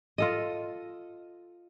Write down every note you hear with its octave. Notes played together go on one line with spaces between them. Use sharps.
F4 A4 D#5